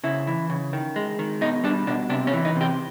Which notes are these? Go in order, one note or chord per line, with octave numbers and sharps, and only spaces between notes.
C#3 E4
E3
C#3
D#3
G#3
D#3
B2 D#4
G3 D4
B2 D4
C3 D4
C#4
E3
D#4
C3
G4